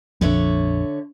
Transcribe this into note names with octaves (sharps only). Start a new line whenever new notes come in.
A#1 F2 D3 C#5 E5